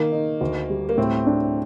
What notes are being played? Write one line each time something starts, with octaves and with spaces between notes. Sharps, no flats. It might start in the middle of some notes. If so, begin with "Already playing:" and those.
Already playing: D#3 A#3
D#4
D2
G3
A#3
A2 C4
D4